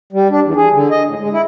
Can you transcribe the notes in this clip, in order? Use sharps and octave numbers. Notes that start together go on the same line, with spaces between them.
G3
D4
E2
G#4
D3
D#5
A2
G#3
E4